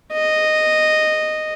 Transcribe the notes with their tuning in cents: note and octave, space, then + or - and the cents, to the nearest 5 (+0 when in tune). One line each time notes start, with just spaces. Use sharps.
D#5 -10